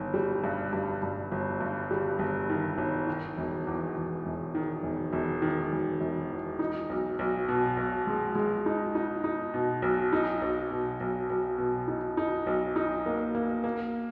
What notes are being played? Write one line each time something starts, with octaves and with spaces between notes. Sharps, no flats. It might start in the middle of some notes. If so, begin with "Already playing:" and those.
Already playing: G1 D#3
G3
G2
G2
G2
G1
G2
G3
G1
D#3
G1
D#3
E1
E2
E2
E1
D#3
E1
E1
D#3
E1
E1
E2
D#4
B1
B1
B2
B1
G#3
G#3
D#4
D#4
D#4
B2
B1
D#4
B1
B2
B1
B1
B2
D#4
D#4
B1
D#4
A#3
A#3
A#3